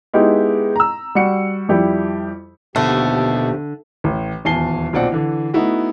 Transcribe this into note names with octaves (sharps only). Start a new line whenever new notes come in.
G#3 B3 D#4 E4 G4
A#5 E6
G3 F#4 C#7
F2 G3 E4 G4
D#2 B2 D3 F3 A3 G4
A1
D#1 E2 G#5 A5 C7 G7
B1 A#2 C4 D5 F#5
D3 E3
A3 B3 D#4 E4 F#4